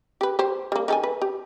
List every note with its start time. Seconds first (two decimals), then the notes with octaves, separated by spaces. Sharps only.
0.21 G4 B4
0.39 G4 C5
0.72 G3 A#3
0.88 D#3 A4 G#5
1.04 B4
1.22 G4